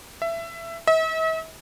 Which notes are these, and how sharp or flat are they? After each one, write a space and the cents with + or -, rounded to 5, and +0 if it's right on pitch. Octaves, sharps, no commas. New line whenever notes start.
E5 +20
E5 -45